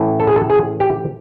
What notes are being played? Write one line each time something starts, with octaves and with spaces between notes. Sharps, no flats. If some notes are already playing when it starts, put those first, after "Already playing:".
Already playing: A2 E3 A3 C#4 E4
A4
G#4
A4
G#4
G4